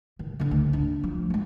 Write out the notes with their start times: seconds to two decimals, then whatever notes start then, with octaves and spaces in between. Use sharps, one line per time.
0.19 D#3
0.40 D3 D4
0.51 D2
0.73 D4
1.04 F3
1.30 F3 G#3